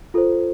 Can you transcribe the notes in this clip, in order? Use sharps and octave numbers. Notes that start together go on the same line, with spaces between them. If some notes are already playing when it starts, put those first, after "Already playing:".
F4 A4 C5